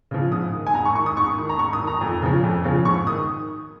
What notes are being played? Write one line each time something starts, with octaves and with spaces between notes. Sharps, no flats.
C#3 F3
G#2 D#6
D#3
G#5
G#2 A#5
C#6
D#3 C#6
D#6
G#2 C#6
D#3
A#5
G#2 C#6
D#6
D#3
A#5
F2
C#3 F3
F2
C#3 F3
G#2 C#6
D#3 D#6